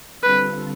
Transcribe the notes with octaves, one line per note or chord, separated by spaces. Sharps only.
D3 G3 C4 F4 A4 B4